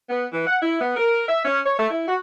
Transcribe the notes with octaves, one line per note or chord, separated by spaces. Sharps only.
B3
E3
F#5
E4
B3
A#4
E5
C#4
C#5
A3
E4
F#4